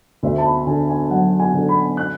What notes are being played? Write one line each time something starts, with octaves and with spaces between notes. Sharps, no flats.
D2 E5
A5
B5
D3 G#5
G#5
F#3 F#5
G#5
D3
B5
F#6